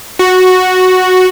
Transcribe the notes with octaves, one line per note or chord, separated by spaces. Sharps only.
F#4